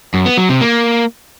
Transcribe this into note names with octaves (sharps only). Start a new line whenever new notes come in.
F#2
B3
F#3
C3
A#3